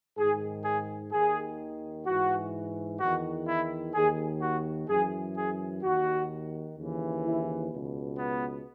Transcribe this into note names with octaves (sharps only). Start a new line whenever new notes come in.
G#2 D#3 G#4
G#4
D#2 D#3 G#4
G#2 E3 F#4
E2 D#3 F#4
E4
D#2 D#3 G#4
F#4
F#2 E3 G#4
G#4
D#2 D#3 F#4
D#2 C#3 E3
E4
C#2 B2
B3